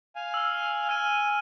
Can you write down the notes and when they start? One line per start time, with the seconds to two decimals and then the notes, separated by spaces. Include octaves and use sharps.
0.16 F5 G#5
0.34 E6 F6
0.89 G#5 F6 D#7